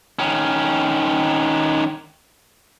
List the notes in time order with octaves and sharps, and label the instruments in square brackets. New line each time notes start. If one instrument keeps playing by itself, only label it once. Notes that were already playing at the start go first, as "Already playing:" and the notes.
[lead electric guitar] D#3 C#4